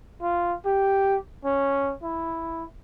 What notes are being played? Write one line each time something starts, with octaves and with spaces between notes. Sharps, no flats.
F4
G4
C#4
E4